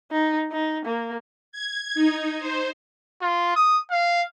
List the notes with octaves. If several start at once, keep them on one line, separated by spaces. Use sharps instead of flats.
D#4
D#4
A#3
G#6
D#4
C5
F4
D#6
F5